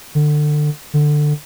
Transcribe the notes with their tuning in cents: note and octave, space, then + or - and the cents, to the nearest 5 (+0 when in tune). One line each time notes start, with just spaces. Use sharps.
D3 +25
D3 +15